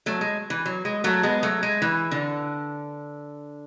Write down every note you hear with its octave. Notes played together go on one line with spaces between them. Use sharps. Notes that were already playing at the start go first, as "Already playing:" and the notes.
F#3 A3
G#3
E3
F#3
G#3
F#3 A3
G#3 B3
F#3 A3
G#3
E3
D3